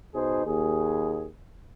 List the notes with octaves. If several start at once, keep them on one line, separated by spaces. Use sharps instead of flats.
B2 D#4 G#4 C5
D#2 G#4